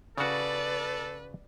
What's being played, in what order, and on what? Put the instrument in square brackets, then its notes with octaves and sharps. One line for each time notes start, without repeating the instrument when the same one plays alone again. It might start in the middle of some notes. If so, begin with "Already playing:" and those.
[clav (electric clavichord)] C#3 F#4 [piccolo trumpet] A4 [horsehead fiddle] B4 [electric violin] D5